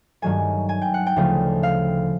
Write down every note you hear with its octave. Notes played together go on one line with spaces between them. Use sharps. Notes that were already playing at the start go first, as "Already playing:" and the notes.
G2 D#3 F#3 A3 G#5
G#5
G5
F#5
G5
D2 C#3 F3 A3
F5